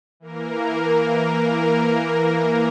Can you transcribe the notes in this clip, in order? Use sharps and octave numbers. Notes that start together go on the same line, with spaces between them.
E3 A#3 A#4